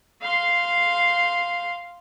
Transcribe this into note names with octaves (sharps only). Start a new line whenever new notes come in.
F5 C6